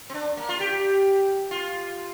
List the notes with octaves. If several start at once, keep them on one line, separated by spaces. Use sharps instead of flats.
C4
D4
A#3
F4
G4
F4